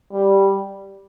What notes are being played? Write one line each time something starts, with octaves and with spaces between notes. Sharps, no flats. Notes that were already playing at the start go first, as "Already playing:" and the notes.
G3